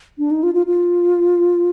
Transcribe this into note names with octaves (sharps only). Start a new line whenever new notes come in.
D4
D#4
F4
F4
F4